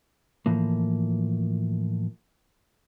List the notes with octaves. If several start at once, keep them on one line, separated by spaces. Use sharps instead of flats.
A2 E3 F3 A#3